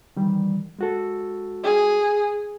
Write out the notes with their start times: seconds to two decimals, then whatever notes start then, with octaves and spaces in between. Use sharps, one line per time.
0.17 D#3 E3 G3
0.79 G#3 F#4 A4
1.64 G#4